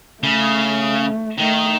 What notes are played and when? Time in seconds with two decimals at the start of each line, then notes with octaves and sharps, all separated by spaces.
0.23 C#3 A3
1.39 D#3 A3